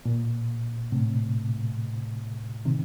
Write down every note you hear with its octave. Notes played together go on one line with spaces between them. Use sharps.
A#2
A2 C3
C3 D#3